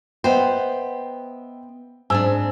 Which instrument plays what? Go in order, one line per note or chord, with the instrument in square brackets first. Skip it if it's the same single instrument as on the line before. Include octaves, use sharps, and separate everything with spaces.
[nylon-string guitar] B3 C5 [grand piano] D#5 E5 G5
[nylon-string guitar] G#2 C4 D4 [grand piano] G#5 E6